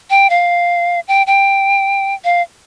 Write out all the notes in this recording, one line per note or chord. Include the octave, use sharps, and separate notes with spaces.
G5
F5
G5
G5
F5